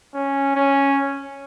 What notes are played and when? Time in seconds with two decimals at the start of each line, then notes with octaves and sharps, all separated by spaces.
0.14 C#4
0.56 C#4